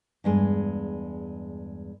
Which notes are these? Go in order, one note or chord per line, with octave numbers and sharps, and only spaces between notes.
E2 G2 G#3